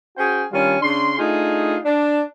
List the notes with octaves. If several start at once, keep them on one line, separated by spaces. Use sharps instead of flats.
C#4 F#4 G#4 C5 G5
D#3 G3 C#4 D4 F4
C#3 D4 C6
A3 D4 D#4 F4 G#4
D4